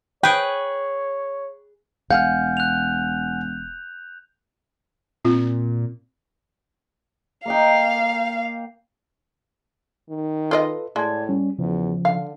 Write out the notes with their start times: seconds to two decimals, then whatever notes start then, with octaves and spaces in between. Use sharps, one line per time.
0.23 G#4 B4 C#5 G5
2.11 E1 F5 F#5 G#5 F6 G6
2.57 F#6 F7
5.25 A#2 C4 F4
7.46 A#3 D#5 F5 G5
10.10 D#3
10.51 F4 A4 B4 D5 D#5
10.96 A2 G#3 D5 A5 G#6
11.29 G3 C#4
11.59 E2 C#3 F3
12.05 D3 F5